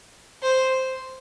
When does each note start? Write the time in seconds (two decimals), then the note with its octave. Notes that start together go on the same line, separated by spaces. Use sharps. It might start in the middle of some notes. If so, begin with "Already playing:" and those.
0.43 C5